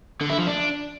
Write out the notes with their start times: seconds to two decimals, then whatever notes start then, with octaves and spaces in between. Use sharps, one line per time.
0.21 D3
0.29 E4
0.38 F3
0.47 D4